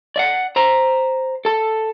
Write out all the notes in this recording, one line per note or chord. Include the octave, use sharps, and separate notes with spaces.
D5 E5 F#5
C5 A#5
A4 A5